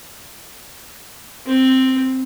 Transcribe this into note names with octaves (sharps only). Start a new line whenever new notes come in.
C4